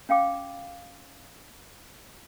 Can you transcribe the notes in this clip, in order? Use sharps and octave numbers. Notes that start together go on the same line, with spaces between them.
C#4 F5 G5 D6